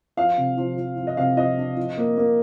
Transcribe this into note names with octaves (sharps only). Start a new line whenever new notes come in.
F3 F5
C3
F3
F3
F3
D#5
C3 F5
F3 D#5
D4
F3
A#3
A#3